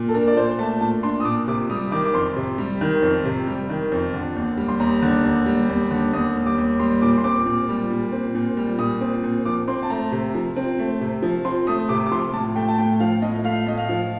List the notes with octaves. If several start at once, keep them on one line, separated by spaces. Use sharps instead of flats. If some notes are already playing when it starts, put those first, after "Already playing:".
Already playing: A#2
A4
D4 A#4
D5
A#2 C5
A3 A5
A#2 A5
D4 C6
D#6
A#2 D6
C3 D6
G3 D#6
D#3 D6
D6
F2 C6
C3
G3
D#3
F2
C3
G3
D#3
F2
D3
D#2
G3
C6
D#2 A#5
D3
D#2
G3
D#2
D3
D#2 D#6
G3
D6
D#2
G3 C6
A#2 D6
C6
C4 D6
A#2
G3
A#2
C4
A#2
G3
A#2 D#6
C4
A#2
F3 D6
C4 C6
A5
A3 A#5
C3
F3
C4
A3
C3
F3
C4 C6
A3 D#6
C3 D6
D6
F3 C6
A2 A5
A3 G5
A5
A2 G5
F3 F5
A2 D#5
A3 F5
A2 D#5
F5
F3